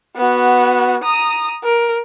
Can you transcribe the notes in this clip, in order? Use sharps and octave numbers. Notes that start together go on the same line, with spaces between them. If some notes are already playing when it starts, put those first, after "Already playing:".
B3 F#4
A#5 D#6
A#4